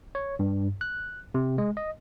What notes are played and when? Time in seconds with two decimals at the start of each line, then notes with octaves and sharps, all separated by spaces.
0.15 C#5
0.39 G2
0.81 F#6
1.34 C3
1.58 G#3
1.77 D#5